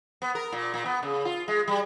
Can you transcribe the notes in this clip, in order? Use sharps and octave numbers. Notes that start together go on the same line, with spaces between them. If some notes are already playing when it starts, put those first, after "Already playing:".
B3
A#4
A#2
A#2
B3
C#3
F4
G#3
G3